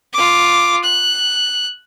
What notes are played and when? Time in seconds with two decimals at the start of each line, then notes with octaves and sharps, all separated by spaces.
0.13 F4 D6
0.83 F#6